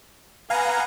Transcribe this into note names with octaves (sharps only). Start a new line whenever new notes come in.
B3 F5 F#5 G#5 A#5